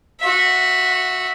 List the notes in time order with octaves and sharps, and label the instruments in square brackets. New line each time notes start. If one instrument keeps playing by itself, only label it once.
[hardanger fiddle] F#4 E5